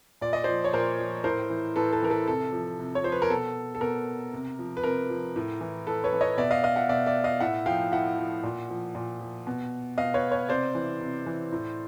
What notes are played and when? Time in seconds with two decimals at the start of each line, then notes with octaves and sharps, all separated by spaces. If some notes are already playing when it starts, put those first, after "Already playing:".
0.21 A#2 D5
0.33 D#5
0.44 F3 C5 D5
0.64 C#5
0.73 A#2 A#4 C5
0.99 F3
1.24 A2 A#4 C5
1.50 E3
1.76 A2 A4 B4
1.92 A4 B4
2.02 E3 A#4
2.10 A4 B4
2.28 C3 A4
2.53 F3
2.79 C3
2.95 C#5
3.04 F3 C5
3.12 B4
3.22 A#4
3.30 B2 A4
3.75 A4
3.81 B2 A#4
4.33 C3
4.59 F3
4.77 B4
4.84 C3 A#4
5.10 F3
5.36 A2
5.61 E3
5.87 A2 A4 B4
6.04 B4 C#5
6.13 E3
6.21 C#5 D#5
6.38 B2 D5 E5
6.51 D#5 F5
6.64 D#5 F5
6.76 E5 F#5
6.89 B2 D5 E5
7.06 D5 E5
7.24 D#5 F5
7.40 A2 E5 F#5
7.66 F3 F5 G5
7.92 A2 E5 F#5
8.17 F3
8.43 A#2
8.70 F3
8.95 A#2
9.21 F3
9.47 B2
9.98 B2 D#5 F5
10.14 B4 C#5
10.31 B4 C#5
10.49 C3 C5 D5
10.75 E3
11.01 C3
11.26 E3
11.52 A2